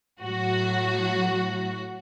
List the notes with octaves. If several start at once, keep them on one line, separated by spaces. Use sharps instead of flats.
A2 F#3 F#4